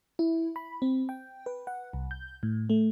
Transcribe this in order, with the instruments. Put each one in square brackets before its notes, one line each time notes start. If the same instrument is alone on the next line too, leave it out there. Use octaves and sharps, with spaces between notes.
[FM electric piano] E4
B5
C4
G5
B4
F#5
C2
G6
A2
A3